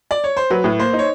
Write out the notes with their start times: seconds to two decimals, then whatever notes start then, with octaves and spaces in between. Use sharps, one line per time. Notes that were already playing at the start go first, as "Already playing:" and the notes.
0.11 D5
0.24 C#5
0.37 C5
0.50 F#3 B4
0.64 A2
0.79 A#3 C5
0.93 D#4
0.99 C#5